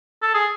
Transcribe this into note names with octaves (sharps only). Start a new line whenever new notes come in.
A4
G#4